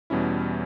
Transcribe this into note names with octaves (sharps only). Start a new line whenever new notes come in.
E2 B2 G3 C#4 E4